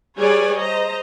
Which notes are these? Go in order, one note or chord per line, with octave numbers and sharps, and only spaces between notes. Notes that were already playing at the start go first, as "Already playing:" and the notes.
G3 G#4 B4 C#5 D5 G#5
C5 D#5 A#5